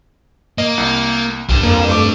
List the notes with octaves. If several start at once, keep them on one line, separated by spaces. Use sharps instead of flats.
A#3 D#5
C2
C2 G3 D4
F2 A#3
A3 D6